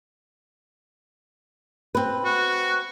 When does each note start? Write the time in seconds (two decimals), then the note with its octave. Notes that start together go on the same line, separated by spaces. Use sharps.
1.95 C4 B4
2.25 F#4